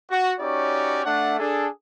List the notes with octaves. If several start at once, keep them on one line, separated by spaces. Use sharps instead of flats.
F#4
C#4 D#4 F#4 G4 C#5 D5
A3 D4 F#5
D4 G#4 A4